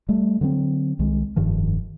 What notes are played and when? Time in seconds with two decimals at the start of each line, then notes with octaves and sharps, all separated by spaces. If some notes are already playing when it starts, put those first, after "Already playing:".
0.09 G3 A3
0.41 D3 F#3 A#3 C4
0.99 C2 D#3 G#3
1.36 F1 G2 D#3 F3